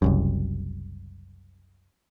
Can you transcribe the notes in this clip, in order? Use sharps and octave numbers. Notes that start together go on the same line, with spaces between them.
F#1 C2 F#2